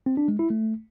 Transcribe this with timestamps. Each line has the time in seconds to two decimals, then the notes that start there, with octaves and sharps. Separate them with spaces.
0.06 C4
0.17 D4
0.28 G#3
0.39 E4
0.50 A3